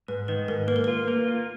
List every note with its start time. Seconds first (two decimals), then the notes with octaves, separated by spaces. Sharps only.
0.08 G#2 B4
0.28 D#3 B4
0.48 G#2 A#4
0.68 A#3 B4
0.76 A#4
0.84 B4
0.88 F4
1.08 A#3 A#4
1.28 F4